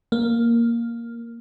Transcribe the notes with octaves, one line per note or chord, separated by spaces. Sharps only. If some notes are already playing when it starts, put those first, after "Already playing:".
A#3